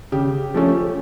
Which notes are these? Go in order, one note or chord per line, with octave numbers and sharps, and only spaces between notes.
C#3 G4
F3 A3 C#4